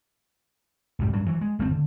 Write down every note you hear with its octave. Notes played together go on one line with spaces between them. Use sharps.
C2 G#2 C3 G3
G2 F#3
E3 F#3
G#3
G1 A3 C4
D3